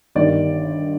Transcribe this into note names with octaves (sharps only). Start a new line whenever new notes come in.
G1 G2 D#3 D5